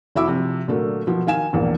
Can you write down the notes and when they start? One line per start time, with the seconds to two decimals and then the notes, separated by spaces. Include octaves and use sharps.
0.15 F1 E4 F#4 E5 D6 E6
0.27 C3 F3
0.68 A#2 D3 F#3 A3 A#3
1.07 B2 F3
1.27 D#3 F5 G#5 E7
1.53 E1 A#1 A#3